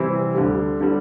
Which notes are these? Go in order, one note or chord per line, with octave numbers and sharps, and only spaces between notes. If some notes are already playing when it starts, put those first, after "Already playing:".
Already playing: C3 E3 G3 C4 E4
D2 D3 G3
D3 G3